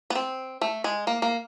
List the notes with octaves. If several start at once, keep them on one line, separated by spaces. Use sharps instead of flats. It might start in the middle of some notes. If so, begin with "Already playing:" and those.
B3
C4
A3
G#3
A#3
A#3